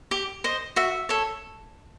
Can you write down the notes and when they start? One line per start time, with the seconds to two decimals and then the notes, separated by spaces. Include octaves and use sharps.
0.11 G4
0.44 C5 D#5
0.76 F#4 E5
1.09 A4 C#5